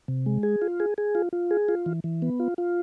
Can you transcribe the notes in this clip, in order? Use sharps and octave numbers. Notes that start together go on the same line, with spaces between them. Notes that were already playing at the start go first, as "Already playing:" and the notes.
C3
G#3
G#4
F4
G#4
G#4
F4
F4
G#4
F4
E3
E3
B3
F4
F4